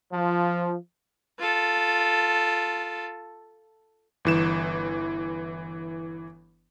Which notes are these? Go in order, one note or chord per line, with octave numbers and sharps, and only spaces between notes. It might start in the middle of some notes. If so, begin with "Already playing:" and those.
F3
F4 A4
G1 E3 E7